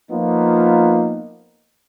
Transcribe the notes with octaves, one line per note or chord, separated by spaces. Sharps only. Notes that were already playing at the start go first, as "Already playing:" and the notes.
F3 A#3 B3 D#4 F4